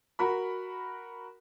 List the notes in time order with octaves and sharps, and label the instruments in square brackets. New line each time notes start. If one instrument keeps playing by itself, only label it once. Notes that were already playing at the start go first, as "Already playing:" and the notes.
[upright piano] F#4 A#4 B5